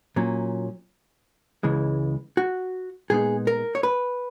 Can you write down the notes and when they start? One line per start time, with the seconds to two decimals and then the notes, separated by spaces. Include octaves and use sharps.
0.16 A#2 F#3 C#4
1.63 C#2 C#3 E3 G#3
2.37 F#4
3.10 A#2 G#3 B3 D#4 G#4
3.47 A#4
3.75 C#5
3.83 B4